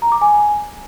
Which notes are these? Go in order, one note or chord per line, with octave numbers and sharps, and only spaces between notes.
A#5
D6
G#5